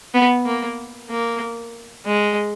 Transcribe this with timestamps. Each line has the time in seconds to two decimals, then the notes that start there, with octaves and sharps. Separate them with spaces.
0.14 B3
0.46 A#3
1.10 A#3
2.06 G#3